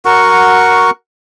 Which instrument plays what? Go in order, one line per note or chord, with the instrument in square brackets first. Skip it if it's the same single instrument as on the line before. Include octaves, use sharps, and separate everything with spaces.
[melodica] F#4 A#4 F#5 C#6